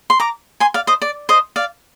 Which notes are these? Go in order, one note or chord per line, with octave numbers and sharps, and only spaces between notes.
C6
A#5 D6
G#5 C6
D5 F5
C5 D#5
D5
C5 D#5
D5 F5